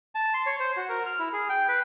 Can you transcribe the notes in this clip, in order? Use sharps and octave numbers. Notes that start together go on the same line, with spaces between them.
A5
C6
C#5
C5
F#4
A#4
F6
E4
G#4
G5
B4